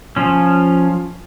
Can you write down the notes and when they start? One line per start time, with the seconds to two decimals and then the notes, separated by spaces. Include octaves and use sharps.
0.16 F3 C#4